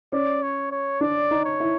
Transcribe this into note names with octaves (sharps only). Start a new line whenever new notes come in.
C#4 D5
C#5
C#5
D4 D5
D#4
C#5
E4